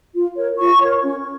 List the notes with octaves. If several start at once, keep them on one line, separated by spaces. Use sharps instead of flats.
F4
A#4 C#5
F4 C#6
A#4 C#5
C#4